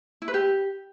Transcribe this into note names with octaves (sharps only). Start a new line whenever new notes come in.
E4
B4
G4